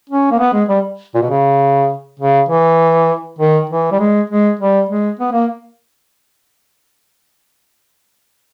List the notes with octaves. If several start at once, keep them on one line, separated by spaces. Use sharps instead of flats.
C#4
A#3
B3
G#3
G3
A#2
B2
C#3
C#3
E3
D#3
E3
G3
G#3
G#3
G3
G#3
B3
A#3